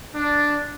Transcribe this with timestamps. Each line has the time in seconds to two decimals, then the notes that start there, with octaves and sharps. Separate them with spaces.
0.14 D4